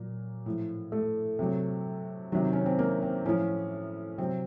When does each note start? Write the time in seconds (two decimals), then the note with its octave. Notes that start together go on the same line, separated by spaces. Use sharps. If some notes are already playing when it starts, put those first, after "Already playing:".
Already playing: A#2 F#3 A#3
0.46 A2 F3
0.92 A3
1.39 C3 F#3
2.32 C3 D#3 F#3
2.53 C#4
2.66 C4
2.79 A#3
3.02 C4
3.25 A2 F3 C#4
4.18 C3 F#3 C4